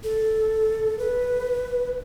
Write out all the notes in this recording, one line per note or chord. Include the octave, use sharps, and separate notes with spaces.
A4
B4